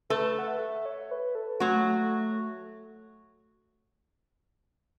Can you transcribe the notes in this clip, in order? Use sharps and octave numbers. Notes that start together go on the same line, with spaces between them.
A3 A4 B4
F#5
E5
C#5
B4
A4
F#3 A3 F#4
A3
A3